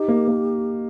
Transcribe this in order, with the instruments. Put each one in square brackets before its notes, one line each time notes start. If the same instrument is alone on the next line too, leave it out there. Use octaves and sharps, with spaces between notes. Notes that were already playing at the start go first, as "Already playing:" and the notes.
Already playing: [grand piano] D#4 [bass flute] G4
[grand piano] A#3
A#3